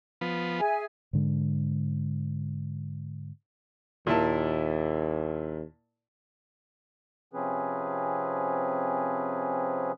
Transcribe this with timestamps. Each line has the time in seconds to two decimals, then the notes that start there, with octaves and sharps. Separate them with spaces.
0.21 F3 B3
0.59 G#4 E5 G#5
1.13 G#2 D3 G#3
4.07 D#2 A#2 E4 A5
7.33 C3 F3 C4 C#4 G#4 B4